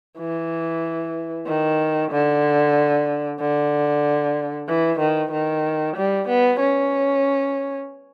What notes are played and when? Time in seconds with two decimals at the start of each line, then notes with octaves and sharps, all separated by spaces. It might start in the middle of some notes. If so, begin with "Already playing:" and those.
0.19 E3
1.47 D#3
2.11 D3
3.40 D3
4.68 E3
5.00 D#3
5.32 D#3
5.96 G3
6.28 B3
6.60 C#4